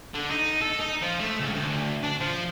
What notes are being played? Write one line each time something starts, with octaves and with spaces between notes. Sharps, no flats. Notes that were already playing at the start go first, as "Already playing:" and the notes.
D3
D#4
A4
D#4
F3
A3
C#2
D2
D4
F3